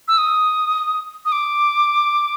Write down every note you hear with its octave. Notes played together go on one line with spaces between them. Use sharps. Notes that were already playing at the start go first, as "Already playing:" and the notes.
E6
D#6
D#6
D6